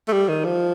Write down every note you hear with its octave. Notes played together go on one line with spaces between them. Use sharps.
A3
G3
D#3
F3